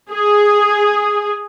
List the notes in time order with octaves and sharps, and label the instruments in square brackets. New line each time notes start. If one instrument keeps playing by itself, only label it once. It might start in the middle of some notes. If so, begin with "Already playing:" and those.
[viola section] G#4